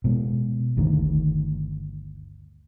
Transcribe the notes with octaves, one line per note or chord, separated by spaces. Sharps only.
B2 G#3
G1 D2 D#3